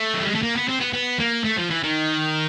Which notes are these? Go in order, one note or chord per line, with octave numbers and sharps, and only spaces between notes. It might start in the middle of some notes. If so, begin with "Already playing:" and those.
Already playing: A3
F#3
G3
G#3
A3
A#3
B3
C4
B3
B3
A#3
A3
F3
E3
D#3